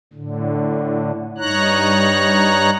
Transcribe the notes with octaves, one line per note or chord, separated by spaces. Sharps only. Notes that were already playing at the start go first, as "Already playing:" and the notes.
A2 D3
G2 D#4 C#5 A#5 F#6